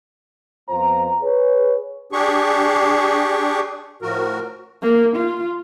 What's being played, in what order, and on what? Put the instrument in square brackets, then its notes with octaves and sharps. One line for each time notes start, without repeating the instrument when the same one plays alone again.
[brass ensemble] F2 B3 F4 C5 A#5
G#4 B4 C#5
[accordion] D4 G4 G#4 C#6
A2 F3 F#4 A#4
[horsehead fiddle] A#3
F4